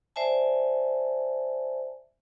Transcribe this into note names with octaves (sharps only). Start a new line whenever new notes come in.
C5 D5 E5 G#5 A5